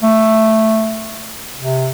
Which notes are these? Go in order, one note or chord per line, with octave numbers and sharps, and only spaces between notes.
A3
C3